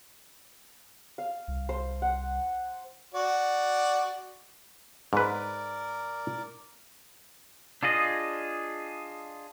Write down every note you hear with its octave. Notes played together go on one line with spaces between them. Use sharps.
F5
C2
C5
F#5
F#4 D5
G#2 A#4 B4 D5
D4 F4 G#4 D#5